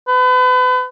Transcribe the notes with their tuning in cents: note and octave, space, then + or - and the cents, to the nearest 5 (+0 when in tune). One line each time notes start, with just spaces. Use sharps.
B4 +35